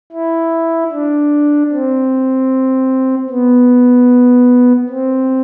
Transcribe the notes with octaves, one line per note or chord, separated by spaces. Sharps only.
E4
D4
C4
B3
C4